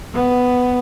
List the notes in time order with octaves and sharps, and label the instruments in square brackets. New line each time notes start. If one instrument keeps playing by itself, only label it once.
[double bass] B3